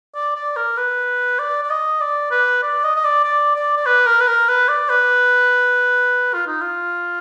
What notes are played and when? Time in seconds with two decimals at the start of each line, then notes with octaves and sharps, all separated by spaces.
0.15 D5
0.36 D5
0.56 A#4
0.77 B4
1.39 D5
1.63 D5
1.70 D#5
2.00 D5
2.31 B4
2.63 D5
2.84 D#5
2.96 D#5
3.04 D5
3.24 D5
3.56 D5
3.77 D5
3.86 B4
4.06 A#4
4.20 B4
4.27 A#4
4.48 B4
4.68 D5
4.89 B4
6.34 F4
6.47 D#4
6.61 F4